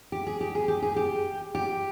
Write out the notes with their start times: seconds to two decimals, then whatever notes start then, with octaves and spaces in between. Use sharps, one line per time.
0.12 G4
0.27 G#4
0.41 G4
0.55 G#4
0.68 G4
0.83 G#4
0.96 G4
1.55 G4